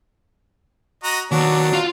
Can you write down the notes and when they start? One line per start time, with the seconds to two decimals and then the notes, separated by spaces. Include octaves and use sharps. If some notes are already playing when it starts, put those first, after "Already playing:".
1.04 F#4 D#5 A#5
1.31 D#2 B2 F#3 D4 F#4
1.73 F4 F5